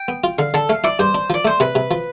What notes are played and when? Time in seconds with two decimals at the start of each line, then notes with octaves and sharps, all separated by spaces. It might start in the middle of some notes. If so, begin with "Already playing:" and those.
Already playing: G5
0.08 B3
0.24 F4
0.38 D3 F5
0.54 D3 A4
0.69 A3 F5
0.84 E4 D5
0.99 G2 C5
1.15 D4
1.30 F3 D5
1.45 A3 C5
1.60 C3 B4
1.75 C3
1.91 F3